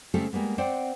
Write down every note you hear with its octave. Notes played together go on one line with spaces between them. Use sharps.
C#3 G3 A3 C4 G4 A4
G3 G#3 A#3 B3
C4 C5 D5 F#5 G5